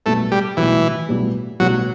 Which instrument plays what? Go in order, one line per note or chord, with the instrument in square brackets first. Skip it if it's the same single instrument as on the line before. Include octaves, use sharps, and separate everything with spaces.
[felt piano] B1 A2 G3 B3 [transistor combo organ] A3
[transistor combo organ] G3
[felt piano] B1 A2 G3 B3 [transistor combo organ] E3
[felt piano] B1 A2 G3 B3
[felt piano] B1 A2 G3 B3 [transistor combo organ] F#3